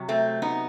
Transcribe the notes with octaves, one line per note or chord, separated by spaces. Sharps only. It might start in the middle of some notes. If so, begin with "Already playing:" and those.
Already playing: C3 F#3
A3 C4
B3 D#4